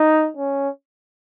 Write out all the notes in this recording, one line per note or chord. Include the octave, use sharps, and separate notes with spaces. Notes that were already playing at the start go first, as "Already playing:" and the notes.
Already playing: D#4
C#4